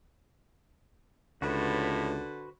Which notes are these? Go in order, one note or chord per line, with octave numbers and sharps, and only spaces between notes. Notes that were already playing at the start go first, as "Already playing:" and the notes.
C#2 A2 D3 F#4 B4 C5